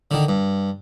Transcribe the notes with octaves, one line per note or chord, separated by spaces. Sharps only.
D3 D#3
G2